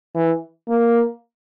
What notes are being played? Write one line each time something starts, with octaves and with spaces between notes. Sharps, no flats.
E3
A#3